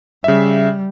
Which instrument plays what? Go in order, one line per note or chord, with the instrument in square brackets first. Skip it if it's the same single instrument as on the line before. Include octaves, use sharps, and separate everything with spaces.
[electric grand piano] C#3 E5 [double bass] G3